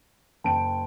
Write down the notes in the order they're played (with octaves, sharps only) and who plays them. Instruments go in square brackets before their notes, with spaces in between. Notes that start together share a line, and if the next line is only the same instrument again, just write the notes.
[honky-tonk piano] F#1 G5 D7 [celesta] A5